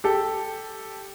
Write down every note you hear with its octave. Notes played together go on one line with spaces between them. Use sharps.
G4 A4